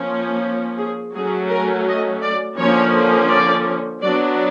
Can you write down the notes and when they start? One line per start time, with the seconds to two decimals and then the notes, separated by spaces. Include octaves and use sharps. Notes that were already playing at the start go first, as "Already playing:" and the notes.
Already playing: F3 A#3 C#4
0.79 G#4
1.15 F#3 A3 C#4 G#4
1.51 A#4
1.87 D#5
2.22 D5
2.59 D3 F3 A#3 C#4 C#5
3.30 D5
4.02 F#3 B3 D4 D5